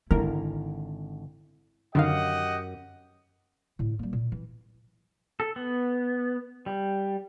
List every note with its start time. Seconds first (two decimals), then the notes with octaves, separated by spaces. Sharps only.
0.11 G#1 D3 E4 A#4
1.95 F#2 D3 D#3 G4 D#5 F5 F#5
3.79 A2 D3
3.99 G3 A#3
4.13 A#2
4.32 E3
5.40 A4
5.56 B3
6.66 G3